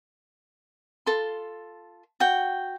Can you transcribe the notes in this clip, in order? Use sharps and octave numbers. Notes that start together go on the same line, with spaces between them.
F4 A4 C6
F#4 G5